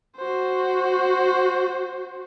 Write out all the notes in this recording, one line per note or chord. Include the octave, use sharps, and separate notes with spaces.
F#4 C5